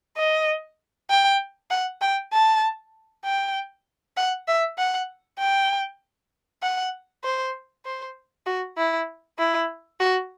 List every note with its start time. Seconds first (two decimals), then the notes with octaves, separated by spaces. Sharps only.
0.17 D#5
1.10 G5
1.71 F#5
2.01 G5
2.33 A5
3.24 G5
4.17 F#5
4.48 E5
4.78 F#5
5.39 G5
6.62 F#5
7.24 C5
7.85 C5
8.46 F#4
8.77 E4
9.38 E4
10.00 F#4